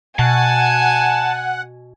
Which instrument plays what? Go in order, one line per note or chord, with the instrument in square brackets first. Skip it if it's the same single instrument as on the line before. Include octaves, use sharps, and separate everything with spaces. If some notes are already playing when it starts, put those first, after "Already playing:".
[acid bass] B2 [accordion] F#5 [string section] G#5 [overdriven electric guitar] A5